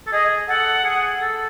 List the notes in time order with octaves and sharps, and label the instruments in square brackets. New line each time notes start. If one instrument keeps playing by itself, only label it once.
[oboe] A4
[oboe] G#4 [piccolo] D#5
[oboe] A4 [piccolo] F#5
[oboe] G#4
A4